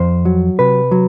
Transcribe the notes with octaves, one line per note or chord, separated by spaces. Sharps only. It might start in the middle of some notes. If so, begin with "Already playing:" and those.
Already playing: F2 C5
F#3
C3 B4
F#3